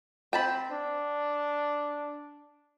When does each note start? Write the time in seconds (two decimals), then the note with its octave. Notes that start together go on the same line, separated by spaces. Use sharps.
0.33 C4 G5 A5 B5
0.70 D4